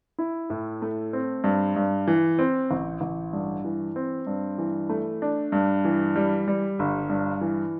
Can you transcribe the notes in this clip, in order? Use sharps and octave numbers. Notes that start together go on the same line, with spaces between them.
E4
A2
A3
C4
G2
G2
E3
C4
A1
A1
G2
E3
C4
G2
E3
A3
D4
G2
E3
G3
G3
G1
G2
E3